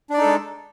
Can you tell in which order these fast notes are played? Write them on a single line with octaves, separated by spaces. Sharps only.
D4 D5 D#4 A4 G#3